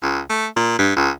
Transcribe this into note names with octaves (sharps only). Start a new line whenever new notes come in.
C#2
A3
A#2
G2
C#2